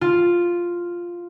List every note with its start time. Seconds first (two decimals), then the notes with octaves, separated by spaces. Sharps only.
0.01 F4